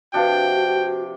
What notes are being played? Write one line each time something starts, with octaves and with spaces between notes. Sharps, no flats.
C3 F3 D4 F#4 B4 F5 G5 A5